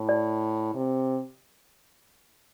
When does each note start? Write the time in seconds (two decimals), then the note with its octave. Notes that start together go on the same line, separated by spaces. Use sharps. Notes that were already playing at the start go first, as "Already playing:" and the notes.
Already playing: A2
0.09 D5
0.75 C3